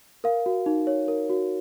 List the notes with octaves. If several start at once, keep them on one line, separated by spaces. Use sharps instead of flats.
A#4 F5
F#4
D#4
C#5
A#4
F#4